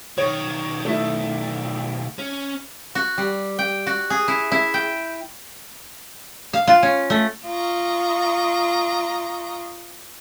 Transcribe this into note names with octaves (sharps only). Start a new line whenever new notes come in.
B1 D#3 C#5
A3 E4
C#4
F#4
G3
G5
F#4
G#4
E4
E4
G5
F5
F4
C#4
A3
F4 D#5 A#5 C#6